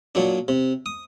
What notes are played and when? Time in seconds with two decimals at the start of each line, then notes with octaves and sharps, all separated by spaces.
0.15 A#2 F#3 D4
0.48 C3
0.86 D#6